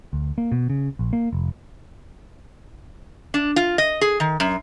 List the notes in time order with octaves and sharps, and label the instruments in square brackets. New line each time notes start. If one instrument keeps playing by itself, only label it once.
[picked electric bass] D2
A#3
B2
C#3
A#1
A#3
F1
[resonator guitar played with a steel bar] D4
F4
D#5
G#4
D#3
F#2